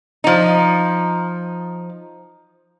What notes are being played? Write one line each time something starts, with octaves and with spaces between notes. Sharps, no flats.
F3 D#4